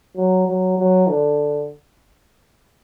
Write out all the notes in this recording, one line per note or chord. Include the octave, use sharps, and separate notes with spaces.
F#3
F#3
F#3
D3